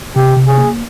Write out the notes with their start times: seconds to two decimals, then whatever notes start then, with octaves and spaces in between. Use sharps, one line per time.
0.16 C3 G4
0.37 C3
0.47 G#4
0.58 A#3